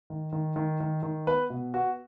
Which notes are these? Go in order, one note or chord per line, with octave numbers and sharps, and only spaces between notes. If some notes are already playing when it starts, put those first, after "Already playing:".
D#3
D#3
D#3
D#3
D#3
B3 B4
B2
B3 F#4